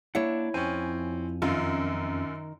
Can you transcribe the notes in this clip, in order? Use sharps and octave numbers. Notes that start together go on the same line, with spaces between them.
A#3 D4 E4 C#5 F#5
F2 C4 C#4 G#5
F#2 D#3 F4